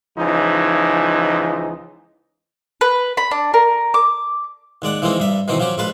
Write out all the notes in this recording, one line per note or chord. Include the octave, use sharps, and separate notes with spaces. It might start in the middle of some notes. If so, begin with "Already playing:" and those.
C#2 E3 F3 D#4
B4
B5
D4
A#4
D6
D#2 G#3 D5 F#5
E3 F3 G#3 A#3 C4 D#4
G2 G3 E5
B2 D#3 E3 C4 D#4
F3 F#3 C#4 G4
A#1 G#3 F4 B4 A5